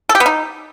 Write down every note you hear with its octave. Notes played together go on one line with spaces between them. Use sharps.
A4
G4
B3
D#4